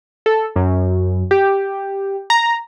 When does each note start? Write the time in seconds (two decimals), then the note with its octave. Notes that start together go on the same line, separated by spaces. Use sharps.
0.26 A4
0.56 F#2
1.31 G4
2.30 A#5